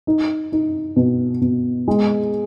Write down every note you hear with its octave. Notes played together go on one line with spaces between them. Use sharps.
D#4
D#4
B2
B2
G#3